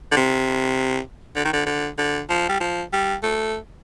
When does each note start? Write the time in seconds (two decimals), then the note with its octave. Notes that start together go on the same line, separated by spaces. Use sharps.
0.11 D3
0.17 C3
1.36 D3
1.45 D#3
1.53 D3
1.66 D3
1.98 D3
2.29 F3
2.49 G3
2.60 F3
2.93 G3
3.23 A3